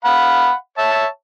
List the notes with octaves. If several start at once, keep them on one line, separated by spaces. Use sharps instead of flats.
F5 F#5 B5
C#5 E5 A5